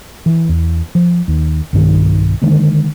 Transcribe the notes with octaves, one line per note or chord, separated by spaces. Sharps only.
E3
E2
F3
D#2
B1 G2 D#3
D3 D#3 G#3 A#3